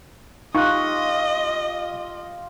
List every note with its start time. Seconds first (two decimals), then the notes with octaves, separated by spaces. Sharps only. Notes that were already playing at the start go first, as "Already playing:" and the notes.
0.55 D#4 F4 G4 D#5 C#6 F#6